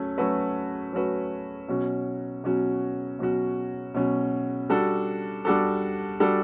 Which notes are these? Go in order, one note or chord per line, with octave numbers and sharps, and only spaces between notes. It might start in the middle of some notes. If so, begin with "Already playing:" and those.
Already playing: F#3 A3 C#4
F#3 A3 C#4 F#4 B4
F#3 A3 C#4 F#4 B4
B2 F#3 C#4 F#4
B2 F#3 C#4 F#4
B2 F#3 C#4 F#4
B2 F#3 C#4 F#4
G3 D4 F#4 A4
G3 D4 F#4 A4
G3 D4 F#4 A4